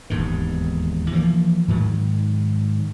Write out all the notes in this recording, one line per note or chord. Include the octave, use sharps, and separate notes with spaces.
E1 D#2 G#2 D#3
E3 F3 G#3 A#3
G#2 D#3 F#3